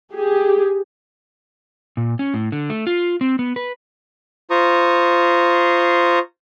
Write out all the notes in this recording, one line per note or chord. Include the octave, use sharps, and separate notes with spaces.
G4 G#4
A#2
C#4
A2
D3
A3
F4
C4
B3
B4
F4 C5 A#5 C#6 D#6